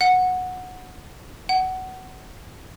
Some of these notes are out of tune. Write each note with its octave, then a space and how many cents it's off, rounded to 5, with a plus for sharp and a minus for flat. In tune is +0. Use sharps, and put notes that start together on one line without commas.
F#5 -10
F#5 +20